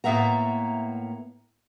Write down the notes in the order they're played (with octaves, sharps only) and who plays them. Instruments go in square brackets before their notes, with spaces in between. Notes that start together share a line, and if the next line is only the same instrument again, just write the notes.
[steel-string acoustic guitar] A2 A#3 B3 E5 F#5 A#5